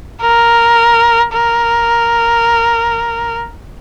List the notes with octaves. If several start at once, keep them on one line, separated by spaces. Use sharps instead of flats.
A#4
A#4